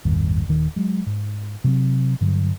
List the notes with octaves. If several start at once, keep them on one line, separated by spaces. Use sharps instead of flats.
A1 E2 G2 D#3
D#1 D#3
F#3 G#3
G#2
C3 F#3 C4
G2 D3 F#3